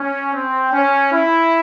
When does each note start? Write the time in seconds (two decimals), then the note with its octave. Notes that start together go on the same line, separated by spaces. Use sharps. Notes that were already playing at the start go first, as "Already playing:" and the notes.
Already playing: C#4
0.33 C4
0.73 C#4
1.12 E4